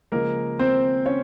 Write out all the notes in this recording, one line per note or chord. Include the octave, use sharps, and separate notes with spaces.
C#3 F3 G#3 A#3 A#4
C4 C5
C#4 C#5